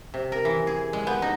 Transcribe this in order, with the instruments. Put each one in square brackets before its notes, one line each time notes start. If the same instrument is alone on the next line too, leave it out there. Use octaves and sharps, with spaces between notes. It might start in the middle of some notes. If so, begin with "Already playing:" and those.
[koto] C3
A#4
E3
G#4
G#3
B3
D#4